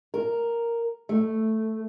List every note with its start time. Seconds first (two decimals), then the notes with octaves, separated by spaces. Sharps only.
0.14 A#4
1.09 A3